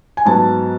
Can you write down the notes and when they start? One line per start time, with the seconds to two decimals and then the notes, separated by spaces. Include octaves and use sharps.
0.17 G#5
0.26 G#2 F#3 B3 A5